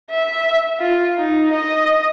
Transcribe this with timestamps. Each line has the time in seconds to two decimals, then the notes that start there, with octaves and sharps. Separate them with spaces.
0.10 E5
0.80 F4
1.19 D#4
1.53 D#5